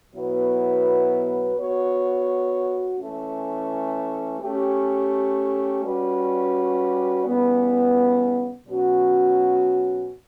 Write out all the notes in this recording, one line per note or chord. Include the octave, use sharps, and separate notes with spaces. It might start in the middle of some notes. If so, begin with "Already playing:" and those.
B2 F#3 B3 E4 B4
B3 F#4 C#5
E3 A3 C#4
A3 C#4 G4
G3 C#4 F#4 B4 D5
C#3 E3 G3 B3
B2 F#3 C#4 F#4